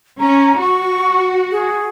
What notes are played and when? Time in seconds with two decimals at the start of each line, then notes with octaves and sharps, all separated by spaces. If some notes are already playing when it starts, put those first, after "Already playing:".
0.20 C#4 A#5
0.61 F#4 C#6
1.51 G#4